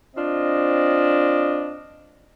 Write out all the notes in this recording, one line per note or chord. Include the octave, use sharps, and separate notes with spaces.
C4 D4 F4 D#5